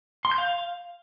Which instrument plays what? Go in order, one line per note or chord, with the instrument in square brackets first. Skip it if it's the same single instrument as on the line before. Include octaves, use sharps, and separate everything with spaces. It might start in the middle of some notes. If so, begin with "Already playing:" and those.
[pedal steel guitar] C6
G6
F5